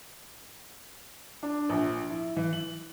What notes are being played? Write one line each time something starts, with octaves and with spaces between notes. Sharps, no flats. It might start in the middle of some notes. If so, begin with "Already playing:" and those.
D4
A#1
E4
E3
F#7